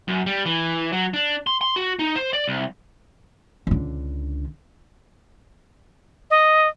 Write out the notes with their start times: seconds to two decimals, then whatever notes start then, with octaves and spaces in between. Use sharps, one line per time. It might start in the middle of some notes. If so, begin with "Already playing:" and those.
0.08 F#2
0.26 G3
0.45 E3
0.92 F#3
1.14 D4
1.47 C6
1.61 C6
1.76 F#4
1.99 D#4
2.16 C5
2.33 D5
2.47 C2
3.67 C#2 D3
6.30 D#5